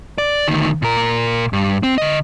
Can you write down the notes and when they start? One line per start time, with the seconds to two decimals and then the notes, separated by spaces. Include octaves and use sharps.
0.18 D5
0.48 D2 D#3
0.82 A#2 A#4
1.53 G2
1.83 C4
1.98 D3 D#5